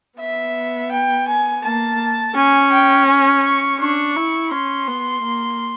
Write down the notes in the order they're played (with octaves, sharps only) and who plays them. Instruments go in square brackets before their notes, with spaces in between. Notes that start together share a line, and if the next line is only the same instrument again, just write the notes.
[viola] B3 [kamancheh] E5
[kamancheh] G5
G#5
[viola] A#3 [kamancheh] A5
[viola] C#4 [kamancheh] G#5
[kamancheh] G5
G#5
C#6
[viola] D4 [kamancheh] C#6
[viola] E4
[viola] C#4 [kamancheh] C6
[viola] B3
A#3